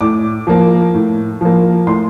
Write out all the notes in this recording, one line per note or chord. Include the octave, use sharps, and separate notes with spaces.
A2 D6
F3 A#3
A2
F3 A#3
A2 C6